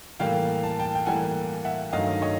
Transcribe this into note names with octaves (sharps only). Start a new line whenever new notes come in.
A2 E3 G3 A#3 F5 G5
A5
G5 A5
G5
A2 E3 G3 A#3 F#5 G#5
E5 F#5
G2 D#3 F#3 A3 D#5 F5
C#5 D#5